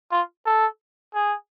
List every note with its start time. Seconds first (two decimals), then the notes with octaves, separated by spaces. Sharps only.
0.12 F4
0.45 A4
1.14 G#4